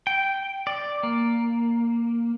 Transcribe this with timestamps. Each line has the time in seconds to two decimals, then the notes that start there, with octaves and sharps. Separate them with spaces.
0.07 G5
0.67 D5
1.03 A#3